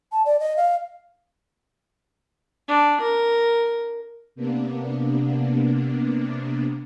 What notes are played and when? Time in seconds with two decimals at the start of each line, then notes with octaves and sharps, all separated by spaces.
0.12 A5
0.26 D5
0.40 D#5
0.57 F5
2.68 D4
3.01 A#4
4.35 C3 A#3 B3 D4